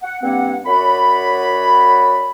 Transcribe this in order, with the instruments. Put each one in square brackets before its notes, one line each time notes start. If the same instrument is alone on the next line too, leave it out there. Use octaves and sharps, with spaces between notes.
[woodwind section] F#5
G2 A#3 C4 F#5
F#2 F#4 C#5 D5 B5